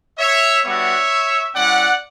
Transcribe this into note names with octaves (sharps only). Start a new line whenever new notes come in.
C#5 E5
G3 B3 D4 F#4 C#5 E5
G3 C#4 E4 D5 F#5